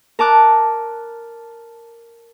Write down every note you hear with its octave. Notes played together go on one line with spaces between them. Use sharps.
A#4 A5 D6 F#6